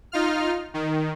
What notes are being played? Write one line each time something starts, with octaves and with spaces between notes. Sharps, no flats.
D#4 F4 F6
D#3